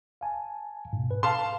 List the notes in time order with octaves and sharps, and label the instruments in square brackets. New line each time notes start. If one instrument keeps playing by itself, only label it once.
[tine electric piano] F5 G#5 A5
G#2 B2
B4
[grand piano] F5 A5 C6